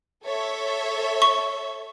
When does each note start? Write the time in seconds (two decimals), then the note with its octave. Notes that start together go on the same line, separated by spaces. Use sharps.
0.25 A4 C#5 E5
1.22 C#6